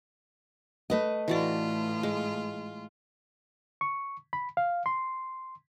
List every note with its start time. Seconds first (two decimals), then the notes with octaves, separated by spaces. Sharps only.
0.90 A3 B4 D#5
1.28 A2 E3 F4 F#4 D5
2.03 G#3
3.81 C#6
4.33 B5
4.57 F5
4.86 C6